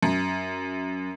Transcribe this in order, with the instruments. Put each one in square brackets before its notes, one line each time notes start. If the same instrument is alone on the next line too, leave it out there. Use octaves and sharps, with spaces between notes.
[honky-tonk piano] F#2